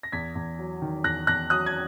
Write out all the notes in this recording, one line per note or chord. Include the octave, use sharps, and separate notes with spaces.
A#6
E2 G#6 B6
E2
F#3
D#3
E2 F#6 A#6
E2 F#6 A#6
F#3 D#6 F#6
G#6